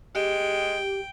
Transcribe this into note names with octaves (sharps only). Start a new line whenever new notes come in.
G#3 G4 G5